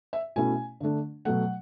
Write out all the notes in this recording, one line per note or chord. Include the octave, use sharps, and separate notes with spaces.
E5
B2 A3 C#4 E4 G#5
D3 A3 D4
B2 F#3 A3 F#5